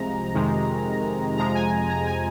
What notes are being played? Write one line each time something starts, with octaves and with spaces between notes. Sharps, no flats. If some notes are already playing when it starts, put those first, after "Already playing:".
Already playing: C2 C3 F3 G#3 A#5
F2 C3 D#3 G#3
F2 C3 F3 G#3 A#5
G#5
A#5
G#5